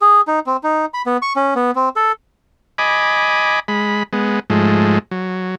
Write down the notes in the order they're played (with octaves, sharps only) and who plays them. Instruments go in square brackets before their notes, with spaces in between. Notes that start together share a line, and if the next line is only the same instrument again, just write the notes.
[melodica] G#4
D#4
C4
D#4
B5
B3
C#6
C#4
B3
C4
A4
[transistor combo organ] D#5 G#5 B5 D6
G#3 B5
G#3 B3
G#2 F3 G#3 A3
F#3